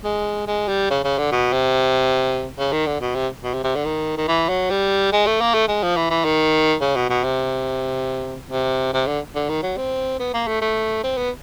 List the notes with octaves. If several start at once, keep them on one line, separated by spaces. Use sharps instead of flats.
G#3
G#3
G3
C#3
C#3
D3
B2
C3
C#3
D#3
D3
B2
C3
B2
C3
C3
D3
D#3
D#3
E3
F#3
G3
G#3
A3
A#3
A3
G#3
F3
E3
E3
D#3
C#3
B2
B2
C3
C3
C3
D3
D3
D#3
F#3
C4
B3
A#3
A3
A3
C4
B3